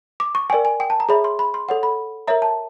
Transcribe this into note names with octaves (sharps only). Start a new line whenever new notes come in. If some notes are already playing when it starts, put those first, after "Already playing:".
D6
C#6
A#4 D5 G5 G#5
G#5
G5
A5
A#5
G#4 C#5 E5 B5
C6
B5
C6
A4 C#5 F#5
B5
A#4 C#5 E5 A#5
A5